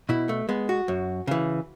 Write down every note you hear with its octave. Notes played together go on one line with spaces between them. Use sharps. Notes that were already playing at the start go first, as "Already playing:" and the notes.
B2 E4
A3
G#3 B3
F#4
F#2
C#3 E3